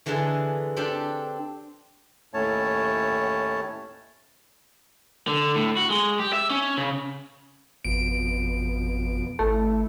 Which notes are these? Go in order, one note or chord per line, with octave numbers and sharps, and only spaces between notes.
D3 E3 G#3 G#4 A4
C4 D4 G4 A4
D#2 A2 A3 C#4 C#5 A5
D3
A2
F#4
G#3
G4
E5
C#4
C#3
G#1 F2 B2 D7
G#1 A3 E4